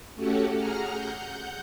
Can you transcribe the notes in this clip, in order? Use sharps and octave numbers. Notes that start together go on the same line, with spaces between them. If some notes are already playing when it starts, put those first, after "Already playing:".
A3 C#4 F#4 G4 A4 F#5
G#4 F#5 A#5 F6
F#5 G6